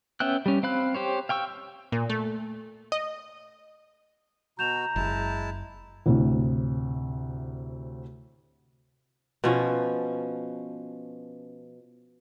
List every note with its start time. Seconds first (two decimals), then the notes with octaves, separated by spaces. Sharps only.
0.20 B3 C#4 E5 G5 F#6
0.46 G3 C#4
0.63 C4 F5 B5 F#6
0.95 G4 C5 C#5
1.29 F5 G5 C#6 E6
1.92 A#2
2.10 A3
2.92 D#5
4.59 B2 F#4 A#5 G6 E7 F7
4.96 F#1 G#3 E4 A5
6.06 D2 A2 C3
9.44 B2 F3 C#4